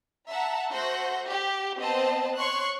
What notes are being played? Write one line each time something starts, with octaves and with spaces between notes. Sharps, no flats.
E5 F#5 A5 A#5
A3 F#4 C5 F#5 G6 A#6
G4
B3 C4 C5 D#5 A5
C#5 C6 C#6 F#6